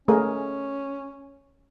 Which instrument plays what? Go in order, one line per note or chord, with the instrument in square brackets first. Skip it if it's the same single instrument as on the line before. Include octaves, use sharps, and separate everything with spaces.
[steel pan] A3 G#4 A#4 [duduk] C#4